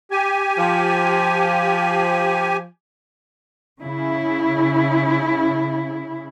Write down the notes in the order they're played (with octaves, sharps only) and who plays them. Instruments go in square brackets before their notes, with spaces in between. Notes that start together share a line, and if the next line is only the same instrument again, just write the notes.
[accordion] G4 G#5
[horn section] F3
[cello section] C#3 E4